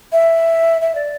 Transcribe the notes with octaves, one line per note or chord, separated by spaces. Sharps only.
E5
E5
D5